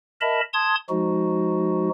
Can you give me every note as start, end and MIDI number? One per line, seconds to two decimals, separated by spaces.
0.21 0.41 70
0.21 0.41 75
0.21 0.41 76
0.21 0.41 81
0.21 0.41 83
0.53 0.75 81
0.53 0.75 84
0.53 0.75 87
0.53 0.75 92
0.90 1.89 53
0.90 1.89 56
0.90 1.89 63
0.90 1.89 66